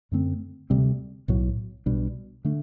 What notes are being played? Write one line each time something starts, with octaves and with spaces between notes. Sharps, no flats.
F#2 D3 A3 C4
D2 C3 G3 C4
B1 A2 F#3
B1 B2 G3 D4
D3 A3 D4